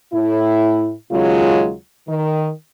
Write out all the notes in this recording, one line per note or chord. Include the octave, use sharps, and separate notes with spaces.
A2 E4
D#2 C#3 F#3 G#3 F4
D#3